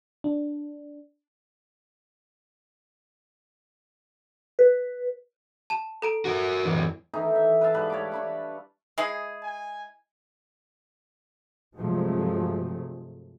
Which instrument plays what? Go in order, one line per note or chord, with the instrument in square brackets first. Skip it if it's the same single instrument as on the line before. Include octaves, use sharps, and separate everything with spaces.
[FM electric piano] D4
[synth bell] B4
[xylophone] A5 E7
A4 A#5 D7
[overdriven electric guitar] F#4 A#4
F#2 E3
[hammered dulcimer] D#3 E3 D#4 A4
E5
B4 E5 F5 A5
G#2 G3 B4
C#5 A5 B5 D6
D4 B5 C#6
[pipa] G#3 E4 G#4
[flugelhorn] G#5
[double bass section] G2 C3 F3 F#3 G#3 A3